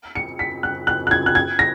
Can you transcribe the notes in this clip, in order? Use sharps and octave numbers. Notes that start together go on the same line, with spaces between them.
C#7
B6
F#6
F#6
F#6
G#6
F#6
G#6
A#6